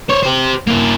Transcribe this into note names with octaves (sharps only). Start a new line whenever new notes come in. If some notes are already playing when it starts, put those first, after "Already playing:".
C5 C#5
G4 C5
A#3 E4